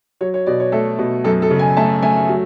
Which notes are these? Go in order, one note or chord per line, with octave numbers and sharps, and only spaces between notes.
F#3 C#5
C#5
B2 D5
C#5
A3 A4
B2
F#2 A4
A4
C#3
G#5
A3 A5
A3 G#5
F#3